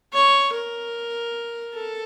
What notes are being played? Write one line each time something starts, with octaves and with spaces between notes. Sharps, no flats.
C#5
A#4
A4